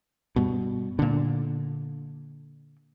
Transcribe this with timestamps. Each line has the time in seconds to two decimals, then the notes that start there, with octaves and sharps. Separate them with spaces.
0.36 G2 B2
0.99 A#2 D3